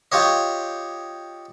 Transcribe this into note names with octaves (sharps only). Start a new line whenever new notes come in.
F4 G4 C#5 D#5